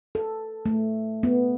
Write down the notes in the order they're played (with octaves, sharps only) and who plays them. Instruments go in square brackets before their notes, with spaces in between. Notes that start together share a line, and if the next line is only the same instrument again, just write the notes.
[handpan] A4
A3
B3